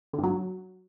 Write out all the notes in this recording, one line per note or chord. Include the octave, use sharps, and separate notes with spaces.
D3
G2
F#3